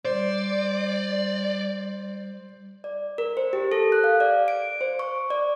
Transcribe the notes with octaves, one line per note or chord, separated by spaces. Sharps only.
G3 C5 D5
D5
A#4
C5
G4
A4
F#6
F5
D5
D7
C5
C#6
D5